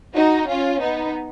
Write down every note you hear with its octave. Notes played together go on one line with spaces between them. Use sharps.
D#4 F#4
C#4 F4
B3 D#4